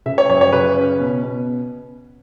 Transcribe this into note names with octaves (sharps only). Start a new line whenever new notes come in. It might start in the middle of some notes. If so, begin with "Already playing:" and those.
C#3 E5
C#5
F#2 C#5
C#5
C#3 B4
C#4
B2
B2